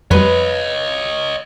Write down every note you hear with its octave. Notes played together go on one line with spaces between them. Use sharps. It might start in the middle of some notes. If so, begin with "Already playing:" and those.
F2 G3 B4 C#5 D#5 C6